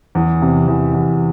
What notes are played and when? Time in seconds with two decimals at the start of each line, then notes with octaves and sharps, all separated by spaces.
0.15 E2
0.42 C3
0.68 E2
0.94 E2